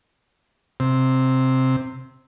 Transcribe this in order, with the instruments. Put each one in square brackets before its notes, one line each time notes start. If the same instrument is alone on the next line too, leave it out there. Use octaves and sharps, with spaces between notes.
[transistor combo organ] C3